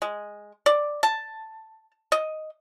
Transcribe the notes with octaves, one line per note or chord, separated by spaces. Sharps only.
G#3
D5
A5
D#5